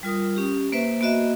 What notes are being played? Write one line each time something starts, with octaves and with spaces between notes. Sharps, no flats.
G3 F4 A#4 D#6
C#4 G4
A#3 B4 C5 E5
A#3 B3 F#4 D#5 E5